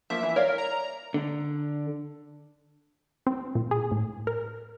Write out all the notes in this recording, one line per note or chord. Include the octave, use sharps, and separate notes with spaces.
F3 A#3 E5
E3
A#4 C#5 D5 F5
A#5
D3
C4
A#2
G#4
A2
A#4